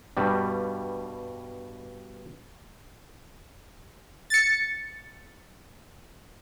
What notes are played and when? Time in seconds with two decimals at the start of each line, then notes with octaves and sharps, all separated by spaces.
0.17 G2 B2 G3
4.30 A6 C#7